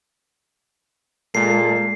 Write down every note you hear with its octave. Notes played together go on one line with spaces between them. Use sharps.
A#2 G#3 A4 C7